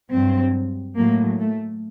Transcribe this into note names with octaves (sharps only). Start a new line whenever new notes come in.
G2 F#3 C4
A2 F#3 A#3
A3